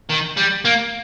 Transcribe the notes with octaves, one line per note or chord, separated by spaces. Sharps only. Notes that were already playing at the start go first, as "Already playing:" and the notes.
D#3
G3
A#3